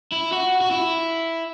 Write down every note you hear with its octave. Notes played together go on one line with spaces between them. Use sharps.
E4
F#4
F#4
E4